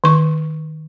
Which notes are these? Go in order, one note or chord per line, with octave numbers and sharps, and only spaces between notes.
D#3 C#6